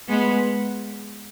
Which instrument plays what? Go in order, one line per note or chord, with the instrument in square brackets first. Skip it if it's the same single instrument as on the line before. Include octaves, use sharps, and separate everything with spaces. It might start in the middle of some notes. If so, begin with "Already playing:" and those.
[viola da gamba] G#3 B3